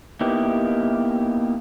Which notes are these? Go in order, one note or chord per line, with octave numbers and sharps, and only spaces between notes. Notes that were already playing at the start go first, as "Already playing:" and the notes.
A#3 B3 D#4 E4 G4